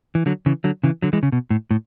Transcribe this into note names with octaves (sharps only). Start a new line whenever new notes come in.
E3
D3 F#3
C#3 E3
D3 F#3
C#3 E3
D3 F#3
E3 G#3
C#3
B2
A2
A2